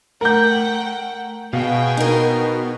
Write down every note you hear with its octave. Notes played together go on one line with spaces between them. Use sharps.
A3 A#4 F#5 G5 G6
B2 G#4 F5 G5
D#4 A#4